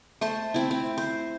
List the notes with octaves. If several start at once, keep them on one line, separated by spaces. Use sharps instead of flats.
A3 C5 A5
C4 E4
C4
C5